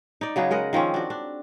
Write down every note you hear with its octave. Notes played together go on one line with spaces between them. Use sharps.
D#4 D5
C#3 F#3 B3 G#4
G#3 A#4 D#5 F#5
D#3 F3 C4 C#4
D4 F#4
D4